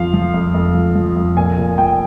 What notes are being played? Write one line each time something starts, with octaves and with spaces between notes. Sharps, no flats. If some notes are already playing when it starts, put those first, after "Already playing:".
Already playing: F2 F3 F5
F3
F2
F2
F3
F3
F2
A#2 G#5
A#2
F3 G5